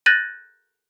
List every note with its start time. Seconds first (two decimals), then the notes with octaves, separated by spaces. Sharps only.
0.06 F#6 G6 A6 A#6 D#7 F#7